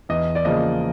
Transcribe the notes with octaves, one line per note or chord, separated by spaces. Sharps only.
E2 D#5
D5
C#3 F3 A#3 D#5